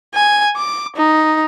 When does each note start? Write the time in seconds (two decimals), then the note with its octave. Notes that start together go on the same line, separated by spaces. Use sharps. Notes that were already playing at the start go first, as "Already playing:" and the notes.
0.14 G#5
0.56 D6
0.96 D#4